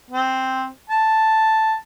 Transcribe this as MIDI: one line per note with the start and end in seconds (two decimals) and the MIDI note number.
0.10 0.66 60
0.90 1.74 81